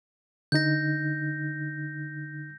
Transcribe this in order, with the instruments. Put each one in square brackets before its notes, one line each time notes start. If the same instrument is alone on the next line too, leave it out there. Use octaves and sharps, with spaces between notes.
[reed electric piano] D3 D#4 [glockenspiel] G6 A#6